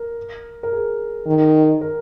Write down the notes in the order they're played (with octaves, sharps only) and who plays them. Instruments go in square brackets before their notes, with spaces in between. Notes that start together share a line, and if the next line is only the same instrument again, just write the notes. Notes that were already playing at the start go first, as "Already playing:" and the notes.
Already playing: [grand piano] A#4
A#4
G#4
[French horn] D#3
[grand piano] A#4